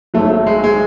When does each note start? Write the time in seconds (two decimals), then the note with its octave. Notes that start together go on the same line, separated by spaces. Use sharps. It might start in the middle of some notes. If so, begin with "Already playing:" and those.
0.14 G#1 G#2 F#3 A3
0.31 A3
0.46 G#3
0.64 G#3